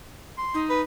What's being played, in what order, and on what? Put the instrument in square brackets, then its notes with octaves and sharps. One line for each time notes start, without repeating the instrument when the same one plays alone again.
[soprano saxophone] C6
[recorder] D#4
[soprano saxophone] B4